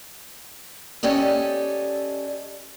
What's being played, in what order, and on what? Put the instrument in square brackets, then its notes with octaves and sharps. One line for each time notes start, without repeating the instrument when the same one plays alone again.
[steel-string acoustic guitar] C#4 G4 A4 D5 D#5